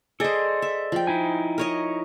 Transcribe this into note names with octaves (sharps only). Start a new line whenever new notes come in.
G#4 A4 C5 D5 D#5
E5
F3 G5
D#4 E4 G#5
A#4 C#5 D#5